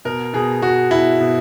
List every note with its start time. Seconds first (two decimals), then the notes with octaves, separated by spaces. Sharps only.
0.05 B2 A#4
0.33 B2 G#4
0.62 B2 F#4
0.91 B2 E4
1.20 B2